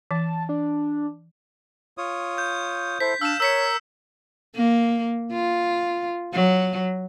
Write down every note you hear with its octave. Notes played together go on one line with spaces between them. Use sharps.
E3 A5
D4
F4 C#5 D#6
G6
E4 A4 C5 B6
D4 F5 E6 F6 E7
A#4 C#5 E6 B6 C#7
A#3
F4
F#3